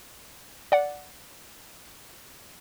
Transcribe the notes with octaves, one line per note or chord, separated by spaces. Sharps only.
D5 F#5